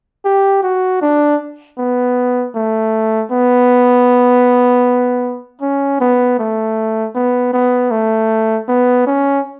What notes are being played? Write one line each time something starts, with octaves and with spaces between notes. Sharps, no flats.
G4
F#4
D4
B3
A3
B3
C#4
B3
A3
B3
B3
A3
B3
C#4